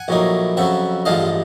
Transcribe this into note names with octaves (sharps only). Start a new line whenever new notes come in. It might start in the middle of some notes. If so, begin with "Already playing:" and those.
Already playing: F#5 G#5
A#1 A2 F#3 A#3 D#4
F2 C#3 F#3 E5 F#5
A1 G2 D3 F3 G#3 D#5 F5